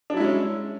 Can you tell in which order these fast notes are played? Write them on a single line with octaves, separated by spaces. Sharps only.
D4 F#3 E4 G#3 C#4